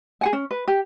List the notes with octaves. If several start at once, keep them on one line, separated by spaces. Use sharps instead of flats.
G#4 F#5 G#5
C#4
B4
G4